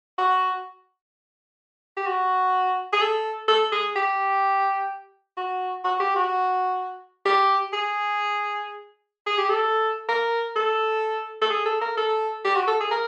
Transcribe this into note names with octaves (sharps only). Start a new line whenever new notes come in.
F#4
G4
F#4
G#4
A4
A4
G#4
G4
F#4
F#4
G4
F#4
G4
G#4
G#4
G4
A4
A#4
A4
A4
G#4
A4
A#4
A4
G4
F#4
A4
G#4
A#4